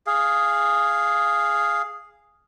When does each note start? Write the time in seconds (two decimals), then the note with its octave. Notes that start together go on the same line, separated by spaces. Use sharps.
0.07 G#4 F5